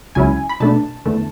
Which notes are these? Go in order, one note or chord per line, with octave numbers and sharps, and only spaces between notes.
C#2 C#3 F#3 C#4 E4 G#5
B5
B2 A3 D4 A5
E2 D3 A3